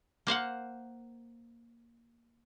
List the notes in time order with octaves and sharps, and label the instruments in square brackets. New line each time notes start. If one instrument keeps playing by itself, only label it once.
[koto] A#3 C5 F5 F#5